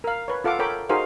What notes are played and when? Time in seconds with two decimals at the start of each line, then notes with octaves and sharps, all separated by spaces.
0.04 A#4 F5
0.28 B4 C#5
0.44 F4 A4 F5 F#5 D6
0.59 A4 A#4 C#5 G5 B5 D6
0.89 D#4 F#4 G#4 A#4 C5 F5